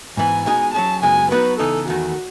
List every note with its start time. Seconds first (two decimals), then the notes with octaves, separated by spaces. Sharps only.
0.17 G#2 E3 B3 G#5
0.46 B2 G#3 D#4 G#4 G#5
0.74 F#3 C#4 G#4 A5
1.02 F#2 C#3 G#3 B3 G#5
1.31 F#3 B3 D#4 F#4 B4
1.59 C#3 E3 B3 D#4 A4
1.88 E2 D#3 A3 F#4